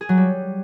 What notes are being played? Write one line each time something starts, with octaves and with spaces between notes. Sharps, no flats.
G#4
F#3
G3